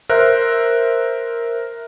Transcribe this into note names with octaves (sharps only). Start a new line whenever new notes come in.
A#4 C5 E5 F#6